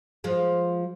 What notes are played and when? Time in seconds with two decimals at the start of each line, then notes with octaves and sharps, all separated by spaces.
0.24 F3 G#3